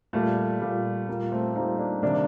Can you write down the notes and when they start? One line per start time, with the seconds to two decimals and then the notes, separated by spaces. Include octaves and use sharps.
0.13 A#2 G3 A3
0.61 A#2 G3
1.08 A#2 G3 A#3
1.31 A3 C4
1.55 A#2 G3 C4 D#4
1.78 A#3 D4
2.02 C3 D#3 G3 A#3 D4